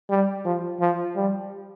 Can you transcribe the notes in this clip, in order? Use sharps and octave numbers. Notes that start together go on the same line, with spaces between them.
G3
F3
F3
G3